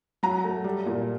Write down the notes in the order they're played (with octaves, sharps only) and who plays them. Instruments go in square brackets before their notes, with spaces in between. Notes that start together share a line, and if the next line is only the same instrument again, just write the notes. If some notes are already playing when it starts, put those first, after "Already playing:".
[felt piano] F#3 A#5
A3
G3
A#2